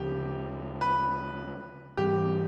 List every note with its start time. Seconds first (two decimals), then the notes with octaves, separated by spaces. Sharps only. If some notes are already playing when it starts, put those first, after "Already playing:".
Already playing: D2 C#3 F3 G4
0.81 B4
1.97 G#2 E3 G3 C4 G4